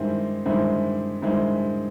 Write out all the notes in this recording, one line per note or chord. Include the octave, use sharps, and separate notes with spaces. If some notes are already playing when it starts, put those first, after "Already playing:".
Already playing: G2 D#3 G#3 C4 E4
G2 D#3 G#3 C4 E4
G2 D#3 G#3 C4 E4